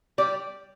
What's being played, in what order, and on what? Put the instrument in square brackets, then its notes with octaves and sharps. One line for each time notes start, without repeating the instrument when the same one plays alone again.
[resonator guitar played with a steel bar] G3 D5